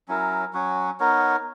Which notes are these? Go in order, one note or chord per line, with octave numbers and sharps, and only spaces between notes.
F#3 C#4 E4 A#4
F#3 C#4 F#4 C#5
B3 D#4 A#4 C#5